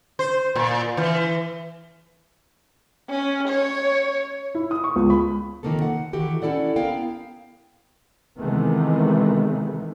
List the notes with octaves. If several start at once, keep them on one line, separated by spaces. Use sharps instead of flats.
C5
A#2
E3
C#4
C#5
E4
D#6
C#6
C#2
B5
C3 D#3 F3 A#3 C4 A4
F#5
D#3 E3 F#4 G4 A4
C#4 E4 A4 D5 F#5
B3 E4 A#4 F5 G5
C3 D#3 E3 G#3 A3 B3